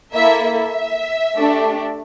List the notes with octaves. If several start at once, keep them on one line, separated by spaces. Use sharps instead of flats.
A#3 E4 A4 E5
E5
A3 D4 G4